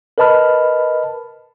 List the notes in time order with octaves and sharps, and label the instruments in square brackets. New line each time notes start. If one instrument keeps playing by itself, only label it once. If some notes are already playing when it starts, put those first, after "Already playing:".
[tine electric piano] A#4 B4 D#5 A5 B5 F6